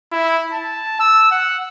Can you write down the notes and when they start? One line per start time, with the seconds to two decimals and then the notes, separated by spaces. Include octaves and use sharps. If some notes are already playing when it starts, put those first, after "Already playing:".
0.12 E4
0.53 A5
1.00 E6
1.31 F#5